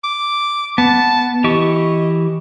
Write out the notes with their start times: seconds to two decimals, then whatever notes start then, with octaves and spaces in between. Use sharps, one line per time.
0.04 D6
0.78 B3 A5
1.44 E3 G4 D#5 C#6